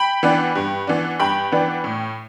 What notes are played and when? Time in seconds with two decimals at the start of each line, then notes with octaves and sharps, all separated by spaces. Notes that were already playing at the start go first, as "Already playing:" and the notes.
Already playing: G5 B5
0.23 E3 B3 D4
0.55 G2
0.87 E3 B3 D4
1.20 G2 G5 B5
1.52 E3 B3 D4
1.84 A2